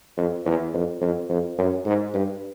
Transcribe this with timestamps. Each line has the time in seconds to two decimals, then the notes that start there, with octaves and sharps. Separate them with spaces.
0.17 F2
0.46 E2
0.74 F2
1.01 F2
1.29 F2
1.59 F#2
1.86 G#2
2.14 G2